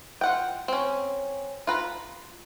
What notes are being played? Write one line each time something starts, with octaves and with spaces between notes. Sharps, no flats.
F4 F#5 G5
C4 C#4
F4 B4 A#5